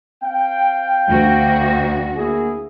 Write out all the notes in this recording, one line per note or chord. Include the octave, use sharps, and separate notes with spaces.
C4 F5 G5
D2 F#4
A#3 E4 G#4